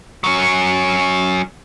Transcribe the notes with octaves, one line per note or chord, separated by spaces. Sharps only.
F#3 C#4